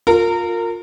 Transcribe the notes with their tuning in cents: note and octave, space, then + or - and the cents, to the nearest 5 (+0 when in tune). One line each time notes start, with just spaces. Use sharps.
F4 +20 A#4 -25